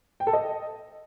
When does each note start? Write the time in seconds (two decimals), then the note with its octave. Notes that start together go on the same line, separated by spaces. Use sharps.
0.20 G5
0.27 A4
0.33 D#5